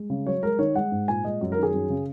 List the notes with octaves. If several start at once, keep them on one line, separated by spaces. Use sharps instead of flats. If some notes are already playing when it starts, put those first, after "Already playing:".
Already playing: G#3
C#3
F#3 C#5
G#3 A#4
D#3 C#5
G#3 F#5
G#2
A#2 G#5
G#3 D#5
F#2
A#4
D#3
G#4
F#2
C#3